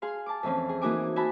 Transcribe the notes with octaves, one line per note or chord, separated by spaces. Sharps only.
G#4 F5 C6
A5 D6
F2 E3 C4 C#4
G#4
E3 A#3 D#4 F#4 G#5 D6
F#4 E5 G#5 A5 B5